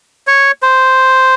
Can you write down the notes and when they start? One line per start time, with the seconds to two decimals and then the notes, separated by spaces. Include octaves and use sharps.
0.27 C#5
0.62 C5